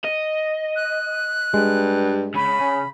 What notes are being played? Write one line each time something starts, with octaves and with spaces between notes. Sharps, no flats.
D#5
F#6
G2 G#3
C#3 B5
C#4